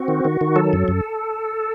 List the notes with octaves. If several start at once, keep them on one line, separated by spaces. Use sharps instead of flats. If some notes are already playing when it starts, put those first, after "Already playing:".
Already playing: C4 F#4
D#3
D#3
D#3
F#3 A4
F#2
F#2